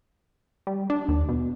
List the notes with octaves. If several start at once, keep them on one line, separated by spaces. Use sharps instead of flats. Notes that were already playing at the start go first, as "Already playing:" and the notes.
G3
D4
D#2
B2